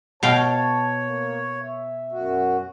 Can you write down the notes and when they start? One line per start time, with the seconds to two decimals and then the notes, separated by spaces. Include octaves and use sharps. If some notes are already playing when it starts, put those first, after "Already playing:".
0.23 B2 C#5 F5 G5 A5
1.06 A#3
1.62 E5
2.12 F#2 F#4